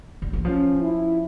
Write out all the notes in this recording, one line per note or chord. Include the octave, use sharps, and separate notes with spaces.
D3
E3
F3 C#4
E4